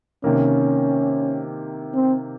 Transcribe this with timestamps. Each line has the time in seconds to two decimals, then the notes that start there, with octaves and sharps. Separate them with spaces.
0.24 C3 D#3 A#3 C#4
1.95 C4